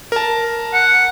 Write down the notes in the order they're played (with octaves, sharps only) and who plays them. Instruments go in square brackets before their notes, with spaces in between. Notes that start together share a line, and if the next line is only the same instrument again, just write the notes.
[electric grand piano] A#4 A5
[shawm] F#5